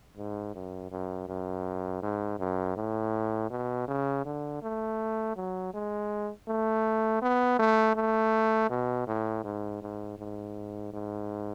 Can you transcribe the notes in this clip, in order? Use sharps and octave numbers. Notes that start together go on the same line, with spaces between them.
G#2
F#2
F#2
F#2
G#2
F#2
A2
B2
C#3
D3
A3
F#3
G#3
A3
B3
A3
A3
B2
A2
G#2
G#2
G#2
G#2